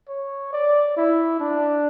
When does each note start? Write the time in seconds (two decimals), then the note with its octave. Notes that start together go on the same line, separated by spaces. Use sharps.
0.09 C#5
0.53 D5
0.97 E4
1.40 D4